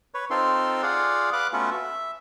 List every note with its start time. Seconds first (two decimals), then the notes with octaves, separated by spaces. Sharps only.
0.14 B4 C#5
0.30 C4 D#4 F4 A4 C6
0.82 F4 G#4 D5 F5 F#5
1.33 B4 F5 D6 F#6
1.53 A3 B3 C#4 F4 F#4
1.71 E5